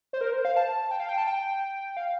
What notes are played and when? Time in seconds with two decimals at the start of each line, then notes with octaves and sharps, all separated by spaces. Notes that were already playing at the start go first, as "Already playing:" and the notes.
0.13 C5
0.21 A#4
0.33 C5
0.45 F5
0.57 A5
0.91 G5
1.00 F5
1.09 G5
1.18 A5
1.27 G5
1.97 F5